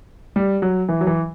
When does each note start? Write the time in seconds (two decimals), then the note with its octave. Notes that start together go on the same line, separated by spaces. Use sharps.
0.36 G3
0.62 F#3
0.89 E3
1.01 F#3
1.07 E3